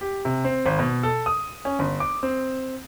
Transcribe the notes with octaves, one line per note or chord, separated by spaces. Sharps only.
G4
C3
C4
G#1
B2
A4
D#6
C#4
G1
D6
C4